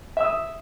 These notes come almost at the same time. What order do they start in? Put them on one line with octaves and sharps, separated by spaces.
E5 E6 D#6